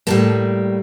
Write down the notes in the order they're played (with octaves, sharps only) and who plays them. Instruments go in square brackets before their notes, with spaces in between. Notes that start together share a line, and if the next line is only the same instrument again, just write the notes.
[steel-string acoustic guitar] A2 G3 A#3 A5